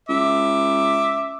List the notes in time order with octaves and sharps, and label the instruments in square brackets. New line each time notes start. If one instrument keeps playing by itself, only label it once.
[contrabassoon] C#2 [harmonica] E5 D6